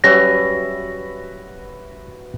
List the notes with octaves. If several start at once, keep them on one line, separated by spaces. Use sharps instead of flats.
F#3 G3 C#4 F#4 B4 E5 A#6